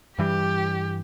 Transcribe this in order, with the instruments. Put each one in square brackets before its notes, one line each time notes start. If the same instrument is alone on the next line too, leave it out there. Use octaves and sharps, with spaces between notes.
[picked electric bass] G2 E3 G3 [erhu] G4